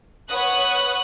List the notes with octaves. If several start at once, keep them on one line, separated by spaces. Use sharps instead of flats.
B4 C#5 F#5 D#6 F#6